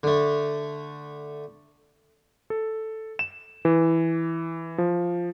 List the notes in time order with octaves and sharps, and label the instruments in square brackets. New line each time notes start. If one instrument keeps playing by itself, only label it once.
[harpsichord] D3 A3
[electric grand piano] A4
E7
E3
F3